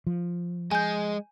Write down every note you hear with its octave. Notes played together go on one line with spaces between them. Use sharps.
F3
G#3 G#5 G6